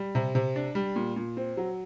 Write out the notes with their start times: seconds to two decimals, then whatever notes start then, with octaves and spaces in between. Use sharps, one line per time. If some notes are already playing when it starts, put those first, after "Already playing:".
Already playing: G3
0.15 C3
0.35 C3
0.56 D4
0.75 G3
0.96 A#2
1.16 A#2
1.37 C4
1.57 F#3